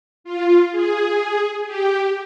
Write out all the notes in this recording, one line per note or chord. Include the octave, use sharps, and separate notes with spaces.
F4
G#4
G4